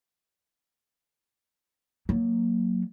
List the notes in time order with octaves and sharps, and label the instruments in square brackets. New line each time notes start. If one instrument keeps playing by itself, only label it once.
[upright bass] F#3 A#3